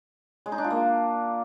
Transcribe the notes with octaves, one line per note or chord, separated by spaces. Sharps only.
G#3
D#4
D4
F4
A#3